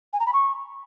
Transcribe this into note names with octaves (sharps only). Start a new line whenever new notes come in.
G#5
A#5
B5
C#6